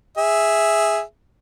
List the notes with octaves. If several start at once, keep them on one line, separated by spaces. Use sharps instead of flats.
G#4 E5